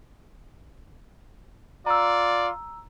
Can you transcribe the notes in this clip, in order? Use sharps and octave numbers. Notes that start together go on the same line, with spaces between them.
F4 D5 A#5 E6